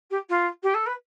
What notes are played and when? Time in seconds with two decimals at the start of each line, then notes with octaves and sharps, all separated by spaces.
0.10 G4
0.29 F4
0.63 G4
0.74 A4
0.86 B4